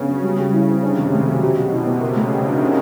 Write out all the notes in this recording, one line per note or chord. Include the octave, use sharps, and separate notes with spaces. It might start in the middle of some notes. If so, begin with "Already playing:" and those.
Already playing: C#3 B3 D4
F#3
G3
G3
E4
C4
C3 D4
D#3
A3
F#3
B2 G4
F#3
C3 E4
B3
C#3 A#4
A3
D#3 F#4
D4
C#4